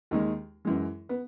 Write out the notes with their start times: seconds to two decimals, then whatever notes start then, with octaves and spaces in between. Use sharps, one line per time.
0.11 D#2 D#3 G#3
0.65 F#2 E3 G#3
1.09 B3